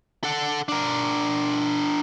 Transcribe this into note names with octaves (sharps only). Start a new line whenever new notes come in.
A4 F#5
D4 A#4